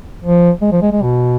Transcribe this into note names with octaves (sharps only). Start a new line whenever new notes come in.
F3
G#3
F3
G#3
G#3
B2